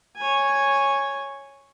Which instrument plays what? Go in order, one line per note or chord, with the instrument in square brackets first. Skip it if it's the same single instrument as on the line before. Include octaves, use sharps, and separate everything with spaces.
[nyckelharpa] C#5 G#5